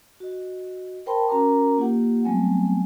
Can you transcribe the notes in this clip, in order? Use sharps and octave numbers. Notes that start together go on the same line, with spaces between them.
F#4 D#5
A#4 C5 G5 A5 B5 C6
C#4 F#4 A#4 A#5 D6
A#3 F4 G4 F#5
F#3 G3 A3 B3 C4 G#5